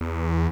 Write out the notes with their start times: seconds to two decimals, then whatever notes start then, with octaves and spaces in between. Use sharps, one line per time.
0.01 E2